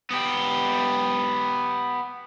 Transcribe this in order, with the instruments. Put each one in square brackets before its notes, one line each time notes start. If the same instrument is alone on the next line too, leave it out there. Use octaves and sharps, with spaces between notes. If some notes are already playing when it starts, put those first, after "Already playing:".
[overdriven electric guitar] B3 G4